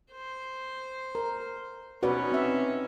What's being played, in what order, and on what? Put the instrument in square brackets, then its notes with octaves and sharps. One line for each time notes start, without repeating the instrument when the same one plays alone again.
[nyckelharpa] C5
[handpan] A#4
[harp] B2 [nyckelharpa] C#4 D#4 [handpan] F#4 B4 D5
[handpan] C4 E5